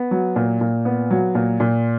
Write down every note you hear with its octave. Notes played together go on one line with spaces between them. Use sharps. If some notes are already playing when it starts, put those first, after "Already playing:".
Already playing: B3
F#3
A#2
A#2
B3
F#3
A#2
A#2